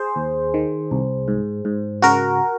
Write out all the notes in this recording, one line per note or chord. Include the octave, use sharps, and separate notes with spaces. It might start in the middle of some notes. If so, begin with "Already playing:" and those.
Already playing: G#4 C5
D#2
D#3
C2
G#2
G#2
C#3 F#4 A#4